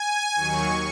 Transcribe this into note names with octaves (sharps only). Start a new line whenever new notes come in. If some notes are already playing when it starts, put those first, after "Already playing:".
Already playing: G#5
D#2 D#3 F#3 C#6